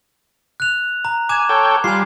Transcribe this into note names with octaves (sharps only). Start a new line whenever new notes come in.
F#6 F7
A#5
G#5 D6 G#6 E7
A4 C#5 G5
G3 F4 G#5 C7